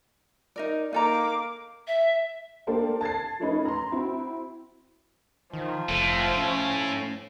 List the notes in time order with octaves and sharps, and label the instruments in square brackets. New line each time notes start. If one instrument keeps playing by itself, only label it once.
[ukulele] D#4 A#4 D5
[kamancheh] A#3 D6 [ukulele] D#4 A4 A#5
[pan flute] E5
[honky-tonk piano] A#3 D4 G4 A4 A#4 C5
A5 G#6 A6 C7
F3 A3 C#4 D#4 B4
A#5 C6
C4 E4 F#4
[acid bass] D#3 [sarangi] F3
[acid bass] F1 [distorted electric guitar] A2
[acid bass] C#4